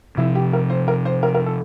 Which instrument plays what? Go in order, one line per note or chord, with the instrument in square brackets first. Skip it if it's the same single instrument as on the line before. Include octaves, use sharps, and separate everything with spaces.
[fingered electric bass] C3 F3 C4 [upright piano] E4
[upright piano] G4
A#4
C5
A#4
C5
A#4
A#4
A4